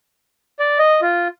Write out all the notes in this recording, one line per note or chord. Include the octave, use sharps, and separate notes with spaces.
D5
D#5
F4